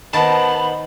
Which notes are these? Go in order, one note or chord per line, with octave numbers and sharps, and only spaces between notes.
D#3 B3 C5 A5 B5